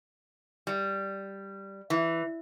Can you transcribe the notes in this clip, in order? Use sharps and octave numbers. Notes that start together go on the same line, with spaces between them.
G3
E3